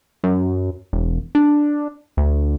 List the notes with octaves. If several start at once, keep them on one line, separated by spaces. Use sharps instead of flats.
F#2
E1
D4
D2